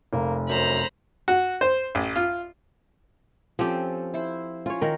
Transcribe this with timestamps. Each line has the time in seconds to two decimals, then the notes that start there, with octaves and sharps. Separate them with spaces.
0.13 F1 A#3
0.49 F#2 C5 A#5 B5
1.28 F#4
1.61 C5
1.95 A1
2.16 F4
3.59 F3 C4 C#4 G4 A4
4.14 E4 C5
4.66 C#4 F4 C#5
4.81 D#3 A#4